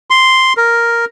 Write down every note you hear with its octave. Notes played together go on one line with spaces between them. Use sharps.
C6
A#4